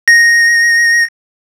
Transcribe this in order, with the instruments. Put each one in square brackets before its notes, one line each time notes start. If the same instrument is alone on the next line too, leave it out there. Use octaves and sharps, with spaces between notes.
[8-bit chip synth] A#6